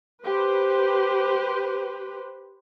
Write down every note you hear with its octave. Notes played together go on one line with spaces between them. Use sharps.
G4 B4 C5